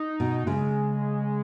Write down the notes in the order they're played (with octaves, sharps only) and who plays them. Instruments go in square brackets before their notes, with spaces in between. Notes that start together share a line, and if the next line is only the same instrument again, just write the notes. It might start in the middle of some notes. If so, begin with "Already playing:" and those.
Already playing: [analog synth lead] D#4
[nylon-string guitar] B2
[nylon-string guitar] C#3 [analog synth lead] G#3